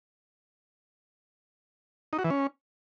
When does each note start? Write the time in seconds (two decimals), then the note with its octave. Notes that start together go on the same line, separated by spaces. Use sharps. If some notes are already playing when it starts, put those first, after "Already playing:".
2.13 D#4
2.19 F#4
2.24 E3
2.30 C#4